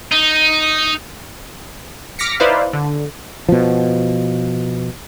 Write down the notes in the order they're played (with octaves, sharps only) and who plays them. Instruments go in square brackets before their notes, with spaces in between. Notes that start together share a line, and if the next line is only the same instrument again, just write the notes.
[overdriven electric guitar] D#4
[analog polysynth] D6 F6 A#6 B6 C#7
D#4 E4 B4 C5 D5 F5
D3
[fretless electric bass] B2 F3